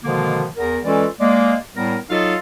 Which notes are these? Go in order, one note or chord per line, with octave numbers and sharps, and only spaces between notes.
B2 D3 D#3 F3 G#3 A#3
E2 A#4
E3 G#3 C#4 F4 A4 D5
G#3 A#3 D5
A2 G3 B3 A#4
F#3 D#4 F4 A4 D#5 F5